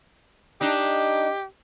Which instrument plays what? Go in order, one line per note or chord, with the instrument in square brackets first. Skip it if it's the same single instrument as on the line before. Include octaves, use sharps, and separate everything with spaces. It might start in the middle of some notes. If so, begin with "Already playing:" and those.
[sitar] D4 D#4 [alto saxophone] G4